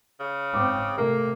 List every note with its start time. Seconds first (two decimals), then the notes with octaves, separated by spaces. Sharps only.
0.20 C#3
0.54 G#2 C4 D6
0.98 C3 A3 A#3 A#4